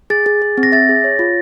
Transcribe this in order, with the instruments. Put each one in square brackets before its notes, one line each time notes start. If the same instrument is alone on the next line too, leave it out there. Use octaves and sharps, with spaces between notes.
[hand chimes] G#4 [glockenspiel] A6
[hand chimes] G#4
G#4
C4
[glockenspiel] A#6
[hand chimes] E5 [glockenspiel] A6
[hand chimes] G#4
C#5
F4